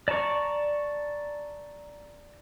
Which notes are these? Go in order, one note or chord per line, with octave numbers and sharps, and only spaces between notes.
D5 A5 A#5 C#6 D6